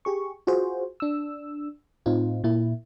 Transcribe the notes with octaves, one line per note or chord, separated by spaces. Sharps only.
G4 G#4 C#6
F4 F#4 G#4 C5
D4 E6
A2 C4 D#4 F4
A#2 A#3 E4